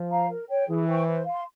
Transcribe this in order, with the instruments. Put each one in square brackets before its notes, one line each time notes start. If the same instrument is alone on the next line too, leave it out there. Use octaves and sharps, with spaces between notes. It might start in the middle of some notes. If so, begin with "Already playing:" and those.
Already playing: [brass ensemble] F3
[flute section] C5 F5 A#5
A#4
C#5 G5
[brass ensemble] E3 [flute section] G#4
[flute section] C5 G5 C#6
C5
F5 C6